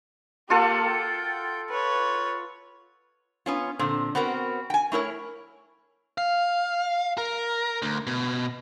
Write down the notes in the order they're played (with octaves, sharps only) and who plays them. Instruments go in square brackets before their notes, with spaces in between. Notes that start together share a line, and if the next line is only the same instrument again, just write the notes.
[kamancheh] A#3 G4 [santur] F4 A4 F#5
[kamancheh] G5
B4 C#5
[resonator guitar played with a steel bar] B3 C#4 F4
A#2 D3 C4
B3 C4 F#4 A#4
G5 G#5
A3 E4 A#4 C#5
[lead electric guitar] F5
A#4
D2
B2